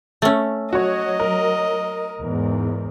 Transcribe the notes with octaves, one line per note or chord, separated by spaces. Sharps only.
A3 C#4
F#3 F#4 C#5 D#5
A#4
E2 G#2